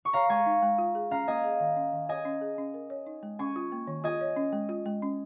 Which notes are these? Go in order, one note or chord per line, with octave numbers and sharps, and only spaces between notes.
C#6
C#5 F5 A#5
G#3 G#5 C#6
D#4
G#3
F4
G#4
C#4 F5 A#5
A#3 D#5 G#5
G#4
D#3
C#4
D#3
C#5 D#5 G#5
C#4
G#4
C#4
A#4
C#5
D#4
G#3
C#4 G#5 C#6
F4
A#3
D#3
F4 D#5 G#5
C#5
C#4
G#3
F4
G#3
C#4